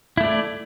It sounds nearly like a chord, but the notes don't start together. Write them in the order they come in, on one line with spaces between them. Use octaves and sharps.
E4 A3 D5